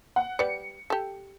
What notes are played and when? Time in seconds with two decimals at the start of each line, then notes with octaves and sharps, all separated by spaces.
0.16 F#5
0.39 G3 B4 D5 C#7
0.90 G4 A4